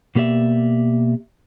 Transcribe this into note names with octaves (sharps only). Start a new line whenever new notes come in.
B2 A#3 G4 D5 E5